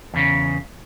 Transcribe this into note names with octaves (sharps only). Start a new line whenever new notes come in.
E2 C#3